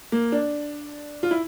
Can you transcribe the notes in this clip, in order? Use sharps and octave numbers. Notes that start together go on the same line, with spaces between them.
A#3
D4
F4
E4